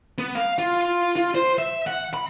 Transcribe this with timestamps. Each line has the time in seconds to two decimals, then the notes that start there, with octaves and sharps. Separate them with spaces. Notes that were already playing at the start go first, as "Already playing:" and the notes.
0.18 B3
0.35 F5
0.58 F4
1.16 F4
1.35 C5
1.58 E5
1.87 F#5
2.14 B5